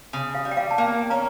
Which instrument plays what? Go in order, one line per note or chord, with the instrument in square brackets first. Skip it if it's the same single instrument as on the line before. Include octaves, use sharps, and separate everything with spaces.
[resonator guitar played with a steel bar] C#3
[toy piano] F5
[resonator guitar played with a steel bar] G3
[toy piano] G5
F5
A5
[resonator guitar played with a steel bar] A#3 [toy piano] G5
[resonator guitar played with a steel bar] C#4 [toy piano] A#5